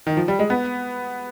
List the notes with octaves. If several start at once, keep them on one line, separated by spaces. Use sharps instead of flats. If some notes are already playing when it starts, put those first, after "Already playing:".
D#3
F3
G3
G#3
B3